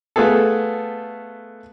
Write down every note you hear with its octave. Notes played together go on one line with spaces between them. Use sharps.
A3 B3 F4 G#4 A4